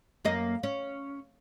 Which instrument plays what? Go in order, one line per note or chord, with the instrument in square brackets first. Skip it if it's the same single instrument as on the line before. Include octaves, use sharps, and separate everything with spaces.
[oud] F#2 A#3 D#5
C#4